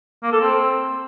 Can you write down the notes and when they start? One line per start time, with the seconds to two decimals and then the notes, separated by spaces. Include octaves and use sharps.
0.23 A#3
0.32 A4
0.42 C4